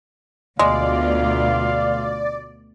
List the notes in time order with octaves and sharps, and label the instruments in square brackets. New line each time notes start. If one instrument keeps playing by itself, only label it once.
[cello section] D2 B2 F4 [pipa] G#3 [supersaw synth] D5 [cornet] F5